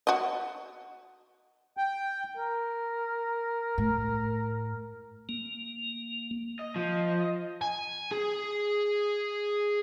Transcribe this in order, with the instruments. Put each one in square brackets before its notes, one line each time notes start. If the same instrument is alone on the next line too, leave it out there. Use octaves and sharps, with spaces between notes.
[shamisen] F#4 D#5
[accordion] G5
[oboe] A#4
[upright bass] A2
[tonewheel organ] A#3
[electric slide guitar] D#5
[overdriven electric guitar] F3
[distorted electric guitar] G#5
G#4